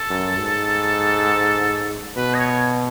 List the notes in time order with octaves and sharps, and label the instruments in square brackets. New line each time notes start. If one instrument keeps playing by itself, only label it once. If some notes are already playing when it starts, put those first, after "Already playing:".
Already playing: [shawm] A4
[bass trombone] F#2
G#2
[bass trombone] B2 [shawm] B4
[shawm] D#5
C#5